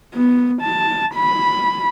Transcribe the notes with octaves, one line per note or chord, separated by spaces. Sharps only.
B3
A5
B5